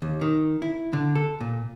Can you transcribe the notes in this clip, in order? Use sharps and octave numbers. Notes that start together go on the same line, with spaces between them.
D#2
D#3
E4
D3
A4
A#2